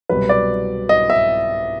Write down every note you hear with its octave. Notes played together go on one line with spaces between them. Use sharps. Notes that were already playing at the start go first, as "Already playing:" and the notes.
C2 B2 F#3 B4
D5
D#5
E5